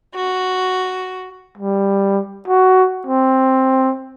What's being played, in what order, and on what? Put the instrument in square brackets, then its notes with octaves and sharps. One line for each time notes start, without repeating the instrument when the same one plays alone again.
[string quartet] F#4
[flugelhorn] G3
F#4
C4